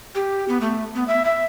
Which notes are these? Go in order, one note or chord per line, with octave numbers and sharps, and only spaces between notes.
G4
B3
A3
B3
E5
E5